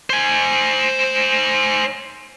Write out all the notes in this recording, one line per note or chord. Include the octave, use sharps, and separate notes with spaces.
C5 G#5